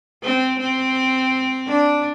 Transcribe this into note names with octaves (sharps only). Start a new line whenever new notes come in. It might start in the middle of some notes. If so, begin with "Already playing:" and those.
C4
C4
D4